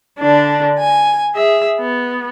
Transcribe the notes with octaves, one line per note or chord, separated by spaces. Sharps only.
D3 D4
G#5
G#4 E5
B3